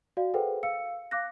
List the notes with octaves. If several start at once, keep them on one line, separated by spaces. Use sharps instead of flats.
F#4 D5 F5
G#4 A4 B4 C5 F#5 G5
F5 E6 C#7
F5 D6 F#6 A#6